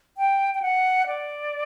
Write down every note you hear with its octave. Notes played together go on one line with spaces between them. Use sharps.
G5
G5
F#5
D5